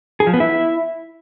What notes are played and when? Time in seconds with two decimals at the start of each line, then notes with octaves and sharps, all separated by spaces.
0.20 G#4
0.27 F3
0.34 B3
0.40 E4